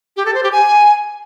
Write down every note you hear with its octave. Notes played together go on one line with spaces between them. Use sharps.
G4
A4
C5
G4
G#5